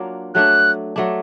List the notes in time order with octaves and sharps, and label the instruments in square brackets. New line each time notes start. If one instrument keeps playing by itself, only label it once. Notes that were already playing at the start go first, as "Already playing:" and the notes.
Already playing: [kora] F#3 A#3 D4 F4
[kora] F#3 A3 D4 [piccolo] F#6
[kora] F#3 A3 D4